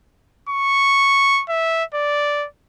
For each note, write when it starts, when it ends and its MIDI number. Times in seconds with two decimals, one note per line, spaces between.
0.49 1.43 85
1.49 1.84 76
1.94 2.47 74